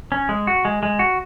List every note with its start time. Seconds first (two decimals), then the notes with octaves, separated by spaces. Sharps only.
0.12 C#4
0.29 G#3
0.47 F#4
0.65 G#3
0.83 G#3
0.99 F#4